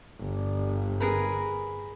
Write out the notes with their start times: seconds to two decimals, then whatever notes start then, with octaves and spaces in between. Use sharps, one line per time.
0.19 G1
1.00 G#4 A#4 B4